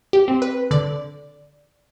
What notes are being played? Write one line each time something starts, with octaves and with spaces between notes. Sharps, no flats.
G4
C4
B4
D3 D5